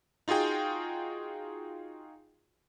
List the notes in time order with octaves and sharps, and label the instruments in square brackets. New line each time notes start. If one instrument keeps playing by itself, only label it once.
[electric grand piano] D#4 F4 F#4 G#4 G5